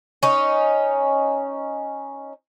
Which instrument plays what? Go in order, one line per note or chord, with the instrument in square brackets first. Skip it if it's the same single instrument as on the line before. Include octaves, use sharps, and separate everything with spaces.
[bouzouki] C#4 D#4